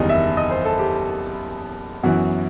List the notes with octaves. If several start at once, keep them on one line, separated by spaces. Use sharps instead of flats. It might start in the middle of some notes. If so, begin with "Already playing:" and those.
Already playing: F#1 E2 D#3 G3 D#5
E5
D#5
C5
A4
G4
F#2 E3 B3 F#4